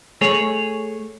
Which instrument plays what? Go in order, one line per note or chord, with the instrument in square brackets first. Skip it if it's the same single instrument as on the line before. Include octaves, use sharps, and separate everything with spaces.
[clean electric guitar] A3 G#4 C#5